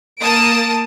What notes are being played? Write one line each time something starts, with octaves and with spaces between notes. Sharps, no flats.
A#3 A5 D#6 D7